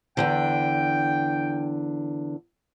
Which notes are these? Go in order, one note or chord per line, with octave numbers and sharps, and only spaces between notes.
E2 G2 D3 G5